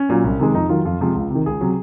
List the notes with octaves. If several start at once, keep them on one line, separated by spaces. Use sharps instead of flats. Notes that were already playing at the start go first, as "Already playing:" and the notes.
Already playing: C#4
A#2 F#3
C2
C3 D#3 G#3
F2 D#4
D#3 F#3 F4
F2 F4
C3 F3 G#3
C#2
C3 D#3
C#2 G#4
C3 F#3